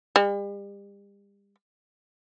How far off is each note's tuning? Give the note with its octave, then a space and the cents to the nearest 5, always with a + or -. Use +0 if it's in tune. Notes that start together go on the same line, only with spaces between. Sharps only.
G3 +40